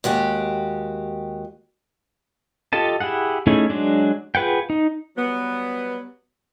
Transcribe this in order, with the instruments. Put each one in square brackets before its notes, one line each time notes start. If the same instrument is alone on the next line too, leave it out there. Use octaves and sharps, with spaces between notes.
[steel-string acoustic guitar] D#2 G#3 F#4 G4
[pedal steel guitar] F4 G4 A4 D#5 A5
E4 G4 G#4 F#5
A3 C#4 D#4 E4 G#4
F#3 G#3 D4
F4 G#4 B4 F#5 G5
D#4
[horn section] F#3 G3 B3